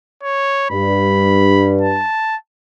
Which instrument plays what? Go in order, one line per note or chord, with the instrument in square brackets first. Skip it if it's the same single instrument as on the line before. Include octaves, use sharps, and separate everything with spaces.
[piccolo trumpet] C#5
[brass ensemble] G2 [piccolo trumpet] B5
[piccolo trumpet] A5